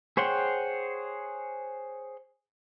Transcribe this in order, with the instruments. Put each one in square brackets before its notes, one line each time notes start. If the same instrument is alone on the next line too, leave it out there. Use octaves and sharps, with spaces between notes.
[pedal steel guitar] G#4 C5 C#5 F#5 G5